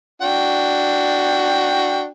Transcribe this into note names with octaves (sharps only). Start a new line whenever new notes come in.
D4 F#4 G5